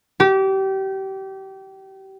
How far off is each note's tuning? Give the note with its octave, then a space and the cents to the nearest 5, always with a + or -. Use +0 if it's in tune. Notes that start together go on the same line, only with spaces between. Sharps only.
G4 -30